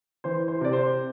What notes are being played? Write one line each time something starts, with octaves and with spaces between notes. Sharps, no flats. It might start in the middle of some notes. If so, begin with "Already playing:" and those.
E3 C5
C5
C3 D5
C5